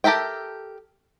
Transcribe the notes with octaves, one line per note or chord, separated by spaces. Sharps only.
G4 A4 A#4 E5 G5